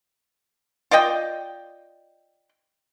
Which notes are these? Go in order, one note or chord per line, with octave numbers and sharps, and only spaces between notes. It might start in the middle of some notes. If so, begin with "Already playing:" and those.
F4 D5 D#5 G5